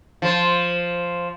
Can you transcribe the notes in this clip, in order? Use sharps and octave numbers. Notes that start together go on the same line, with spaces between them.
F3 C5